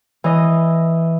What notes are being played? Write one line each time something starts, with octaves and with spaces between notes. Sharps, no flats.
E3 D#5